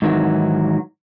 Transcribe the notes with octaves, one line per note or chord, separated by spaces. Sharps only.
G#2 D#3 E3 F#3